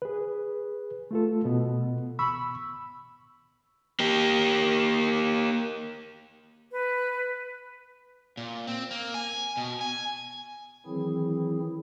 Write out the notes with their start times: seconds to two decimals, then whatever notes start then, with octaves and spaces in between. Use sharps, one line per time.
0.02 G#4 B4
1.11 A3 F4 A4
1.45 B2 B3
2.19 B5 C#6 E6
4.00 A#3 G4
6.72 B4
8.37 A#2
8.67 C4
8.91 A#3
9.14 G#5
9.57 B2
9.81 G#5
10.86 D#3 E3 F#3 C4 E4 G#4